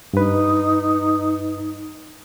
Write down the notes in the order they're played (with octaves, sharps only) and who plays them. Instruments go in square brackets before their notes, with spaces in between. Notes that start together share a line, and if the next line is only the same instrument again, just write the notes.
[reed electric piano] G2 B4 [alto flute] D#4